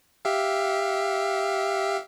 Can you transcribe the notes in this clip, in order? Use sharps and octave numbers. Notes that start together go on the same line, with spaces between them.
G4 E5 F5